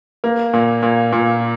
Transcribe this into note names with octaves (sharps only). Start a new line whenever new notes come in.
A#3
A#2
A#2
A#2